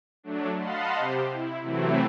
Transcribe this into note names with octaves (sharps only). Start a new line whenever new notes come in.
F#3 A3 D4
D#5 F5 F#5 A5 B5 C6
C3 G4 C5
E4
C3 E3 F#3 A3 C4 E4